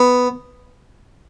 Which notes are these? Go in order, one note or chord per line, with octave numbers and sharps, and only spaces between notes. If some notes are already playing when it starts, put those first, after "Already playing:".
Already playing: B3